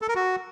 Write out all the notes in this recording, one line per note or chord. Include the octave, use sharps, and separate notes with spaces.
A4
A#4
F#4